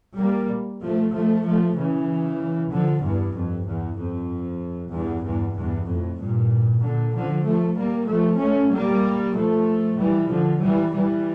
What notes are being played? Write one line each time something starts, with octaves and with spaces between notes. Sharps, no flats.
G3 A#3
F3 A3
F3 A3
F3 A3
C#3 E3
D3 F3
E2 G2
F2
E2
F2
E2 G2
E2 G2
E2 G2
F2 A2
G2 A#2
A#2 D3
D3 F3
F3 A3
G3 A#3
F3 A3
A3 C#4
G3 A#3
F3 A3
E3 G3
D3 F3
E3 G3
E3 G3